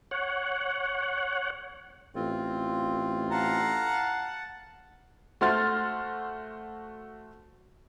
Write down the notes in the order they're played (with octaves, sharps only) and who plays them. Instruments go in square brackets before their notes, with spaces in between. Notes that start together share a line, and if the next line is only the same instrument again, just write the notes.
[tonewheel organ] C#5 F#5
[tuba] A1 [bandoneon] C4 F4
[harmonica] F5 A#5 [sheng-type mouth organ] F#5 A5
[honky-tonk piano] A3 F#4 C5 C6 F6 A6